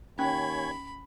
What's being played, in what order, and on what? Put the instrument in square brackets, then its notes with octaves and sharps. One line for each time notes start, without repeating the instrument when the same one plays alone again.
[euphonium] D#2 [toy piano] C#4 [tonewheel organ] C#5 G#5 G#6 [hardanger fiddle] B5